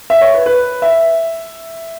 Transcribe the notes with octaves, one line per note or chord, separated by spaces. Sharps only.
E5
C#5
B4
B4
E5